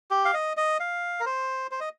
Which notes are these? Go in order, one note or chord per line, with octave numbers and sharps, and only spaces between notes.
G4
F5
D#5
D#5
F5
A#4
C5
C5
D#5